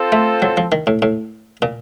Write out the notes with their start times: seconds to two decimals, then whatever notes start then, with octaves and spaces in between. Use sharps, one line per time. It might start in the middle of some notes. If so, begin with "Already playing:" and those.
Already playing: C4 F4 A4 C5
0.12 A3
0.42 F#3
0.57 F3
0.72 D#3
0.87 A2
1.02 A2
1.62 A#2